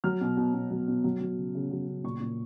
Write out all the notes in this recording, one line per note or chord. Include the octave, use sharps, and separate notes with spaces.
F#3 F6
B2
B2
B2
F#3
B2
F#3
F#3
C#3
C#3
F#3
C#3
A#2 C#6
A#2